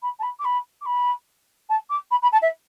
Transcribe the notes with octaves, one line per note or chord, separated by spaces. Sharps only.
B5
A5
B5
D6
B5
D6
B5
A5
D6
B5
B5
A5
E5